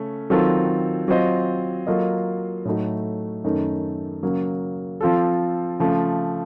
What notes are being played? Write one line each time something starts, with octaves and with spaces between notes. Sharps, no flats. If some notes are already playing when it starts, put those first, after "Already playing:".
Already playing: C#3 A3 C#4
D#3 F#3 C4 F4 A4
F#3 C4 F4 C5 D#5
F#3 A#3 F4 A4 D#5
A2 F#3 A3 D#4 F#4
F#2 D#3 A3 D#4
C#3 F#3 A#3
F3 C4 F4 A4
C#3 F3 A3